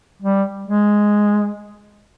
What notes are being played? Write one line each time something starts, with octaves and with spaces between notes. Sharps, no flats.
G3
G#3